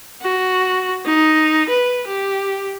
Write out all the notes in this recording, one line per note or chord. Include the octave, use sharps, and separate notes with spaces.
F#4
D#4
B4
G4